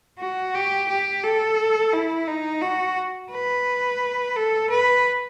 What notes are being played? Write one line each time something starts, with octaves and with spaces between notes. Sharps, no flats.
F#4
G4
G4
A4
E4
D#4
F#4
B4
A4
B4